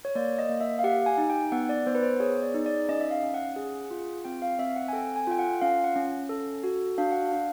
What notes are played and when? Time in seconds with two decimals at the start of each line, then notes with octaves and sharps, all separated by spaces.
0.05 C#5
0.15 A#3 D5
0.39 D#5
0.49 A#3
0.61 E5
0.79 F5
0.84 G4 F#5
1.06 G#5
1.18 D#4
1.30 G5
1.52 B3 F#5
1.69 D5
1.87 B3 C5
1.95 B4
2.03 C5
2.20 G#4 C#5
2.43 D5
2.54 D#4
2.66 D5
2.89 C#4 D#5
3.01 E5
3.11 F5
3.23 C#4
3.34 F#5
3.56 G#4
3.91 F4
4.25 C4 G5
4.42 F5
4.59 C4 E5
4.76 F#5
4.88 G#5
4.93 A4 G5
5.16 G#5
5.27 F4 G5
5.39 F#5
5.61 C#4 F5
5.84 F#5
5.96 C#4
6.29 A4
6.63 F#4
6.98 D4 F5
7.12 F#5
7.26 F5
7.32 D4